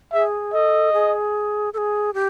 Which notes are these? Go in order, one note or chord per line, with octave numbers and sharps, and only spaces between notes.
G#4 E5
A4 D#5
G#4
A4
G#4
G4